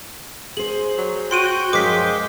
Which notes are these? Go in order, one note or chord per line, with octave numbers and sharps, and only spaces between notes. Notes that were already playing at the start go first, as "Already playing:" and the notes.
G#4 C5 F#7
F#3
F#4 G5 C6 D7 D#7
F#2 F3 G#3 C5 D6 B6